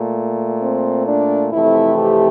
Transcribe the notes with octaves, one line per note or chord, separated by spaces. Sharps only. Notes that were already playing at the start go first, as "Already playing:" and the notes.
Already playing: A#2 A3
C4
D4
F2 C3 E3 A3 E4
G4